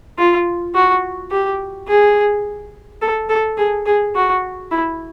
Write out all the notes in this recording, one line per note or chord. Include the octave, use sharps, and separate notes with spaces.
F4
F#4
G4
G#4
A4
A4
G#4
G#4
F#4
E4